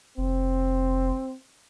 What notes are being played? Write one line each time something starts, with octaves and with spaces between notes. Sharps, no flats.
F1 C4